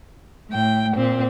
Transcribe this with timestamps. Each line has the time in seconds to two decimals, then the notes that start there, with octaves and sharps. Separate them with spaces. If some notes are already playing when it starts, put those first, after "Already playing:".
0.50 A2 G5
0.95 A#2 C4